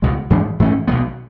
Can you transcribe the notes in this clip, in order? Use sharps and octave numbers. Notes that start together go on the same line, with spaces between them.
C#2 B2 G#3
G#2 E3 G#3 D4
G#2 E3 A3 C#4
B1 B2 G#3 B3